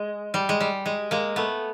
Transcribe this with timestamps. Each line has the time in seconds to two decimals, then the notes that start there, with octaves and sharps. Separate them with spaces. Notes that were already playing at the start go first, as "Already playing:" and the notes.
Already playing: G#3
0.34 G3
0.49 G#3
0.61 G3
0.86 G#3
1.11 G#3 A#3
1.36 A3 B3